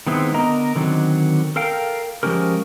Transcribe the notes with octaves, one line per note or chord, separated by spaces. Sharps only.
D#3 G#3 B3 C4 E4
D3 B3 A#4 D#5 A#5
D3 D#3 F#3 C4
A4 A#4 F5 G5
F3 G#3 C#4 G4 A#4